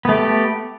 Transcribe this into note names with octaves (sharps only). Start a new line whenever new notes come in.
A3 B3 G4